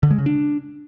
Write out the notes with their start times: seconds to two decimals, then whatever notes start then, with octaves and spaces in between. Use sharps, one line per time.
0.03 D3
0.11 G#3
0.18 C#3
0.26 D4